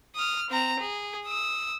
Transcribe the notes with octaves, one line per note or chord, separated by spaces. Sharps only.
D#6 F6
C4 A#5
G#4
D#6 E6